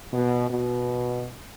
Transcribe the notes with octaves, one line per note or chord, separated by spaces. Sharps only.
B2
B2